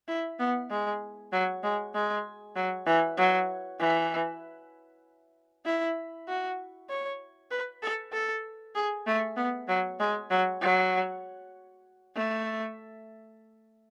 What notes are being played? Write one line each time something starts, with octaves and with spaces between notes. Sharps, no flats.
E4
B3
G#3
F#3
G#3
G#3
F#3
E3
F#3
E3
E4
F#4
C#5
B4
A4
A4
G#4
A3
B3
F#3
G#3
F#3
F#3
A3